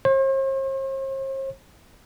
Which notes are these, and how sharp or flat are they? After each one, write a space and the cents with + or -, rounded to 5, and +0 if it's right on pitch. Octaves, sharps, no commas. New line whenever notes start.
C5 +45